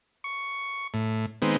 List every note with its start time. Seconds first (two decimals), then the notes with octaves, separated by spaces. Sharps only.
0.24 C#6
0.94 A2
1.42 D#3 G#3 B3 C4